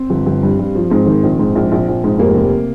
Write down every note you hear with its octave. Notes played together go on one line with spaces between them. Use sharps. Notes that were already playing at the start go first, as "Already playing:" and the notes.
Already playing: C4
G1
G1
G2
G2
F3
G#2 C4
D#3
A#1
G#2
A#1
A#1
A#1
G#2
F1 A#3
C3